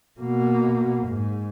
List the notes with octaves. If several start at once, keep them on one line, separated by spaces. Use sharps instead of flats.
B2 A#3
G#2